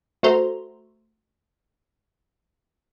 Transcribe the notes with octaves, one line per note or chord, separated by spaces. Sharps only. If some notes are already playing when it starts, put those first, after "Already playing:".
A3 F#4 A4 C5 A#5 C6